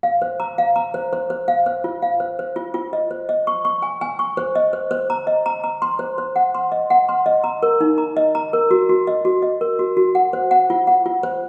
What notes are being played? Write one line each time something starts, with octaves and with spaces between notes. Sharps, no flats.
F5
C5
A#5
F5
A#5
C5
C5
C5
F5
C5
F4
F5
C5
C5
F4
F4
D#5
C5
D#5
C#6
C#6
G#5
G#5
C#6
C5
D#5
C5
C5
A#5
D#5
A#5
A#5
C6
C5
C5
F#5
C6
D#5
F#5
C6
D#5
A#5
A#4
D#4
A#5
D#5
A#5
A#4
F#4
F#4
D#5
F#4
D#5
A#4
F#4
F#4
F#5
C5
F#5
F4
F#5
F4
C5